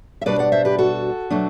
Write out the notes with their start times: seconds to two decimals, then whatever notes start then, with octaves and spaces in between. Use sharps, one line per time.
0.21 E5
0.26 B2 G3 D4 B4 D5
0.39 D5 F#5
0.52 C5 E5
0.65 G4 B4
0.78 F#4 A4
1.30 B2 F#3 A3 D4